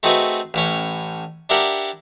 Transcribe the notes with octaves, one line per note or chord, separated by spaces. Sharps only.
A3 C4 D#4 F#4 G#4 B4
A1 A2 C#4
D4 E4 G4 A#4 F#5